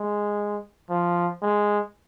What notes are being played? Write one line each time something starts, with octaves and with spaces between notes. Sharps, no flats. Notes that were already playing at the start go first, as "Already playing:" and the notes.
Already playing: G#3
F3
G#3